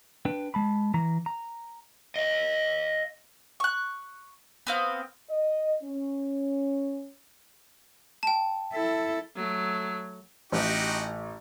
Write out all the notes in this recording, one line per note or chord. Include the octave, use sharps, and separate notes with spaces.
D4 B4 G5
G#3 A5 B5
E3 A#5
A#5
D#5 F5
C#6 F#6
B3 C4 F5
D#5
C#4
G5 A5
E4 A4
F#3 A3
A1 D#4 F#4 G4